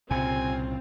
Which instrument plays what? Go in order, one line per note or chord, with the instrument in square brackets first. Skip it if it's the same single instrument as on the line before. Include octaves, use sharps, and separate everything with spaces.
[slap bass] C2 A#2 C#3 [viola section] C4 F4 [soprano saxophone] G#5